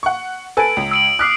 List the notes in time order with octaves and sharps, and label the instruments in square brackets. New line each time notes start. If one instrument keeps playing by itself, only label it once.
[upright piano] F#5 C#6
[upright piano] A4 B4 G#5 [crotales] E6 D7
[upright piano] C#2
[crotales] E6 D7 F#7
[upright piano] D6 F6 F#6 [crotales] D#6 B6 C7